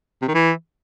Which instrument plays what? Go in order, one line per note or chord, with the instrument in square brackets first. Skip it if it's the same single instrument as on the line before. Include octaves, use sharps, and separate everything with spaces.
[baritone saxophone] C3
D#3
E3